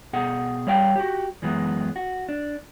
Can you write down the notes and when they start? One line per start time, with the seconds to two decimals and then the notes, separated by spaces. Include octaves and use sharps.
0.13 B2 G#4 F#5
0.67 G3 C#5 F5 G5
0.96 F#4 G4
1.42 F#2 E3 G#3 B3
1.96 F#4
2.28 D4